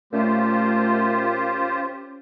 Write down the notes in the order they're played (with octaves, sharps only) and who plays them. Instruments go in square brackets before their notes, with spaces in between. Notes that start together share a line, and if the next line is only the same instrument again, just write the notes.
[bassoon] A#2 [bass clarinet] A3 [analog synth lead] C#4 [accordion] F4 G4 C5